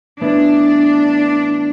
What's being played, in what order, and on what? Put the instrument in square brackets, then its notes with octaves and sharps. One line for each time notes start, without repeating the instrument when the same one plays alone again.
[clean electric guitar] A2 E3 B3 E4 B4 [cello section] D4